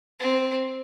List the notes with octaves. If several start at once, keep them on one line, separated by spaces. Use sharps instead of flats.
C4